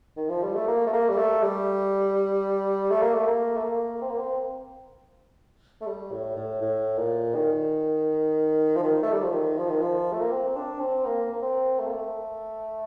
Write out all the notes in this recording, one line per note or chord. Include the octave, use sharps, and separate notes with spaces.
D#3
F3
G3
A3
A#3
A3
A#3
G3
A3
G3
A3
A#3
A3
A#3
A3
A#3
C4
A#3
C4
A3
G3
A2
A2
A2
A#2
D#3
F3
D#3
A3
G3
F3
D#3
F3
D#3
F3
A3
A#3
C4
D4
C4
A#3
A#3
C4
A3
A#3
A3